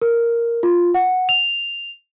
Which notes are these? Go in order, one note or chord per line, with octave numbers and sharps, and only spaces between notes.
A#4
F4
F#5
F7